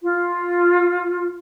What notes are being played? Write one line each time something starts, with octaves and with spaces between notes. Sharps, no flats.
F4